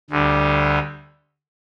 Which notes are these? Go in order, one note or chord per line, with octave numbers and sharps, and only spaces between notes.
D2 D3 G3